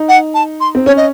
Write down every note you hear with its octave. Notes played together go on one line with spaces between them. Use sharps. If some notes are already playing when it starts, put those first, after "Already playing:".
Already playing: D#4
F#5
A5
C6
C4
C#4 C#5
D#5